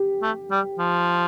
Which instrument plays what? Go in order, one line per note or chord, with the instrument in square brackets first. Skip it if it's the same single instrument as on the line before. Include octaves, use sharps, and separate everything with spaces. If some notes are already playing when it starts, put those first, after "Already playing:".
Already playing: [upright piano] G4
[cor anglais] A3
G3
F3